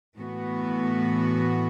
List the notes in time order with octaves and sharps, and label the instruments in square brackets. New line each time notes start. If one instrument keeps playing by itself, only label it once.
[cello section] A2 E3 B3 F#4